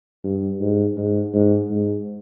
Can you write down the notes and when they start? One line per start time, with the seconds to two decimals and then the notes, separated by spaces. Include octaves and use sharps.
0.24 G2
0.61 G#2
0.98 G#2
1.34 G#2
1.71 G#2